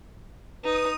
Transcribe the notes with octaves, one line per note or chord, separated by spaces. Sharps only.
D#4 B4 D#6